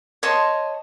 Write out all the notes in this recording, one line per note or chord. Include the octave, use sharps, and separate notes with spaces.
C#5 D#5 A5 C6